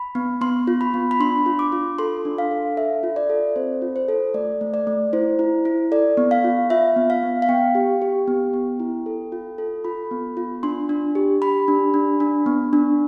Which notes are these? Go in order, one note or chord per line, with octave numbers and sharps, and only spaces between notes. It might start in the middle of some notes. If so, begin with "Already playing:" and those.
Already playing: B5
B3
B3 C6
F4
B5
B3
B5
D4 C6
F4
D6
F4
A4 C6
D4
F5
A4
A4 E5
F4
D5
A4
C4 C5
F4
C5
A4
A3 D5
A3
D5
A3
E4 C5
E4
E4
A4 D5
B3
F5
F4
F4 E5
B3
F5
B3
F5
B3 G5
G4
G4
B3
B3
E4
A4
F4
A4
F4 B5
B3
F4
D4 C6
D4
G4
G4 B5
D4
D4
D4
B3
D4